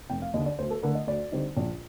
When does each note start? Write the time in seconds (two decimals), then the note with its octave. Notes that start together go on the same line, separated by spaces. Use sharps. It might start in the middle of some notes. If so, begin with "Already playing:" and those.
0.10 F1 G5
0.22 F5
0.34 D#2 D#5
0.37 D3
0.46 D5
0.59 D2 C5
0.71 A4
0.83 D3 A3 A#4
0.95 D#5
1.07 D2 D5
1.32 D3 G3 C4 D#4
1.57 A#1